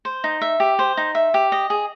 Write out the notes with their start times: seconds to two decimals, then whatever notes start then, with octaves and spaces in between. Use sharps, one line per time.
0.05 C5
0.24 D#4
0.41 E5
0.60 G4
0.79 C5
0.97 D#4
1.15 E5
1.34 G4
1.52 D#5
1.70 G#4